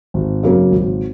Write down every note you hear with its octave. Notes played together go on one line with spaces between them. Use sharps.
G#1
F#2 C#3 F#3 A#3
G#1